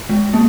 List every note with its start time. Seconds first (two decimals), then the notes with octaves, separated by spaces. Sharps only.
0.09 G#3
0.34 A#3